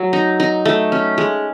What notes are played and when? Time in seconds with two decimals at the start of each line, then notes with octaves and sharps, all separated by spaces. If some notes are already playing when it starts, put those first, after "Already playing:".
Already playing: F#3 A3
0.13 D#4
0.40 D#4
0.65 A3
0.92 C#4
1.18 G#3